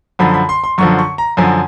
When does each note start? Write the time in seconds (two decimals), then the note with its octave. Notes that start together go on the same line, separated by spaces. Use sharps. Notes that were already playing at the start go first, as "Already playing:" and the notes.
0.19 F#2 D3 F3 B5
0.34 B5
0.49 C6
0.64 C6
0.78 F#2 D3 F3 C#6
0.99 C#6
1.18 A#5
1.37 F#2 D3 F3 G#5